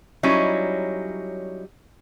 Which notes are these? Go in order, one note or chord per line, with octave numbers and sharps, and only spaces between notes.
F#3 G3 C#4 D#4 E4